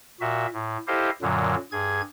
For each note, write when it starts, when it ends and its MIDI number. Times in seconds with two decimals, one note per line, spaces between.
0.21 0.46 46
0.21 0.46 66
0.21 0.46 76
0.53 0.78 45
0.88 1.10 64
0.88 1.10 67
0.88 1.10 69
0.88 1.10 72
0.88 1.10 75
0.88 1.10 77
1.22 1.55 42
1.22 1.55 46
1.22 1.55 50
1.22 1.55 54
1.72 2.01 43
1.72 2.01 68
1.72 2.01 92